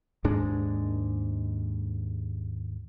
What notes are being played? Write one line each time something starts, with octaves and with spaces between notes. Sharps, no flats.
D#2 G#2 G#3 D4